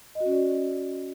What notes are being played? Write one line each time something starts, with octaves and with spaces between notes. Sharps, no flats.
D#5
F#4
C#4
D5